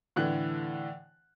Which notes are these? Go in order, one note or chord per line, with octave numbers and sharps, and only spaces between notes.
A2 D3 E3 F#6